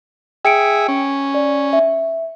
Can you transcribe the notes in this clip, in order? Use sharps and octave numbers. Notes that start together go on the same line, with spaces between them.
G#4 E5 G5 C#7 D7
C#4
D5
E5